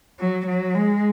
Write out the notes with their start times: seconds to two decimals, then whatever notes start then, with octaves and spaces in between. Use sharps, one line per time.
0.20 F#3
0.47 F#3
0.75 G#3